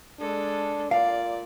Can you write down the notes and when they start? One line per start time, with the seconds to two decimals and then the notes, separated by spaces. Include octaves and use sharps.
0.19 G#3 D4 A4
0.91 A#2 D5 F5